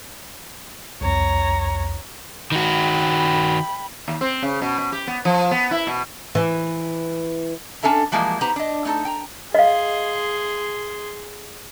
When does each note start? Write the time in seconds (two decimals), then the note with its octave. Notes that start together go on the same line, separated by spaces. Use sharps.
1.01 C2 F2 C#5 A#5
2.52 D#3 F#4 G5 B5
4.08 D#2
4.21 C4
4.42 C#3
4.61 B2
4.78 B2
4.92 G4
5.07 B3
5.25 F3
5.51 B3
5.71 E4
5.87 B2
6.35 E3
7.83 C#4 D4 A4 E5 A#5
8.12 E3 F3 G3 G#3 A#3 E4
8.41 B3 D#4 G4 B4 C5 A#5
8.56 D4 D#5
8.85 A3 D#4 A4
9.05 G5 A#5
9.55 G#4 D#5 F5 C6